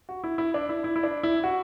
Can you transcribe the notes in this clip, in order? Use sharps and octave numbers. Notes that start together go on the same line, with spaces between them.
F#4
E4
E4
D4
E4
E4
E4
D4
E4
F#4